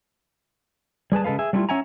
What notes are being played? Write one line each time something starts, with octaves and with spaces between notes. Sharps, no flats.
G3 G#4 B4 A5
C#3 G#3 A4 B4 F5
G#4 E5
G3 A3 C4 E4 F4
C#4 E5 F#5 G#5 A#5